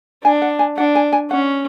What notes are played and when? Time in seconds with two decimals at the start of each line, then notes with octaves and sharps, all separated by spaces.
0.24 D4 G#5
0.42 F#5
0.59 G#5
0.77 D4 F#5
0.95 G#5
1.13 G#5
1.31 C#4 F#5